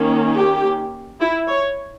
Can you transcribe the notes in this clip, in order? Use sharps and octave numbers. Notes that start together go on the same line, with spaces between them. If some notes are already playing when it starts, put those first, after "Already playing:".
Already playing: D#3 A#3 C#4
G4
E4
C#5